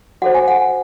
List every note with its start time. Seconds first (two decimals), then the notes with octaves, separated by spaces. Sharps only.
0.22 F#4 A4 C5 F#5
0.34 G#5
0.48 F#5